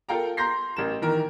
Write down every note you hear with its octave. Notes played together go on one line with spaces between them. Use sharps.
F4 A4 A#4 F5 G5 A#5
A#5 C6 G6 A#6 C7
A1 A#4 E7
D#3 E3 A#4